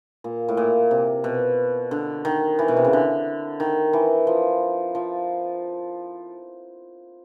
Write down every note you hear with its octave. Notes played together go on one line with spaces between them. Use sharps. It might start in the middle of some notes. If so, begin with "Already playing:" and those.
A#2
A2
A#2
C3
B2
D3
D#3
E3
B2
C3
C#3
D3
D#3
E3
F3
F3